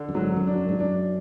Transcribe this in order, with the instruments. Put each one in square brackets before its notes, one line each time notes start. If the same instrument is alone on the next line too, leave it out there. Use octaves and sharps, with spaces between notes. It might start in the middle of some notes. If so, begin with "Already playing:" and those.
Already playing: [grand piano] D3
[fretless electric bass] F#2
[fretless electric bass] G#1 G#2 [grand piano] F#3
[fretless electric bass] F#2
[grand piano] D4
[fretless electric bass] F#2
G#2
[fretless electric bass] F#2 [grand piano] D4